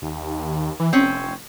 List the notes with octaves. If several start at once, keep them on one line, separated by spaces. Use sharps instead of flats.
D#2
E3
F1 C4 C#4